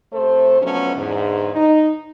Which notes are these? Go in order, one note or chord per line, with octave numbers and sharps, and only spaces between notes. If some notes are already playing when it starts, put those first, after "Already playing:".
C3 A3 A4 C5
D3 F3 F#3 A3 B3 C#4
E2 G#2 D3
D#4